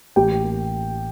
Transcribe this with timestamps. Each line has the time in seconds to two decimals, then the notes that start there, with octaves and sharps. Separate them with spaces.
0.16 A1 G4 G5
0.43 A#3